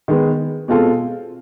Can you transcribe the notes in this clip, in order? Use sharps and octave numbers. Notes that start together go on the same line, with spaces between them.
D#3 G#3 B3
B2 G#3 C4 F4 A4